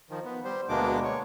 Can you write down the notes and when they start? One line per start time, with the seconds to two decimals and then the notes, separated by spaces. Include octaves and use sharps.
0.10 D#3 F3
0.24 B3
0.44 G3 C5
0.69 D2 B2 G#3 A#3 D4 D6
1.03 C#5